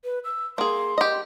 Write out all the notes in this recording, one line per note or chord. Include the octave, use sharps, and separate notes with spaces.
B4
E6
A#3 G#4 C6
G4 D#5